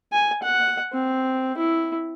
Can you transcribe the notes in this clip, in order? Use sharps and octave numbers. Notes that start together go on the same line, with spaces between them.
G#5
F#5
C4
E4